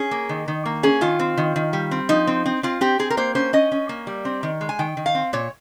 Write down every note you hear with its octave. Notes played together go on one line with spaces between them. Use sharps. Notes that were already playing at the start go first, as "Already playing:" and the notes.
Already playing: C#4 G#4
A#3
D#3
D#3
A#3
C#4 G#4
D#3 F4
C4
D#3
D#3
G3
C4
F3 D#4
C4
C4
C4 F4
C4 G4
C4 G#4
A#4
A#3 C5
C#4 C5
C#4 D#5
C#4
A#3
G3
C4
D#3
G#3
G#5
D#3 G5
D#3
F5
C4
A#2 C#5